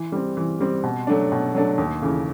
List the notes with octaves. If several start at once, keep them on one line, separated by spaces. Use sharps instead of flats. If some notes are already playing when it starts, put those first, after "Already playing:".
Already playing: E3
G3 C4
E3
G3 C4
B2
F#3 A3 D4
B2
F#3 A3 D4
D#2
C#3 E3 A3